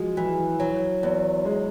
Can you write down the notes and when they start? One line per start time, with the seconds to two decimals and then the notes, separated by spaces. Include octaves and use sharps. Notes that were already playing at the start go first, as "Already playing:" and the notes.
Already playing: F3 F#3 G#3
0.17 E3
0.60 F#3
1.03 E2
1.45 G#3